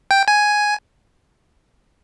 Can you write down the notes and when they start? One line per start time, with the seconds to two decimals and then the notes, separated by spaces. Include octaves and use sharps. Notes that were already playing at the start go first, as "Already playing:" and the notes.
0.11 G5
0.28 G#5